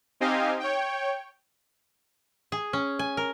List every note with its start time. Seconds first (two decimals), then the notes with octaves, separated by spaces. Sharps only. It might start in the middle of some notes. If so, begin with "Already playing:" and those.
0.20 C4 D#4 G4 D#5 F5 G#5
0.59 C#5 G5
2.52 G#4
2.73 C#4
2.99 G#5
3.17 A#4